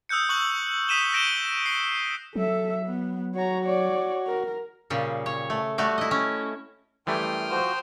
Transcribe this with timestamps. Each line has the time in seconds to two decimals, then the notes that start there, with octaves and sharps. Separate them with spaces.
0.09 D#6 E6 F#6 G6 C#7
0.29 C#6 F#6 F#7
0.88 D#6 B6 D#7 E7 G7
1.13 G6 A#6 D7 E7 G7
1.66 C7
2.36 F#3 A4 E5
2.86 B3
3.35 F#4 C#5 A#5
3.65 C#5 D5
4.27 A#4
4.90 A#2 C#3 G3
5.26 C#5
5.50 A3
5.78 G3 A3 F#4
5.98 E4 D#5
6.11 C#4
7.07 F#2 E3 G3 A3 G5 C6 D#6 F6
7.51 F3 F#4 C5